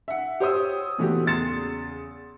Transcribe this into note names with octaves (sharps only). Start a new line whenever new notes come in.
E5 F#5
G4 C5 C#5 D#6 E6
A#2 E3 A3 B3 F#4 G4
E2 C#3 C6 A6 C#7 E7